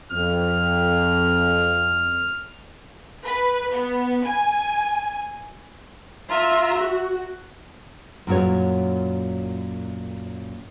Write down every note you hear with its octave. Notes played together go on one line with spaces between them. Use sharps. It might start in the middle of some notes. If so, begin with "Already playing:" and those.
F2 F6
B4
B3
G#5
F4 E5 A#5
F#4
F#2 A#2 F#4 C#5